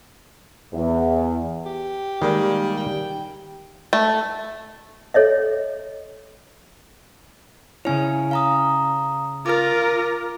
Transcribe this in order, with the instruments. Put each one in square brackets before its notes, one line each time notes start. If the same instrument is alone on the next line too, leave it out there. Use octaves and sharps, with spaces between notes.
[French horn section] E2
[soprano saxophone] G4
[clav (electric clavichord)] D#3 G#3 A#3 [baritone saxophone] G3
[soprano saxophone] G5
[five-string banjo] A3
[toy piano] A4 C#5 D#5 E5
[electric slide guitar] C#3 C#4 C#5 [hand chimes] E4 G#5
[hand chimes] F5 A#5 D#6
[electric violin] F4 A#4 [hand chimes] D6 A6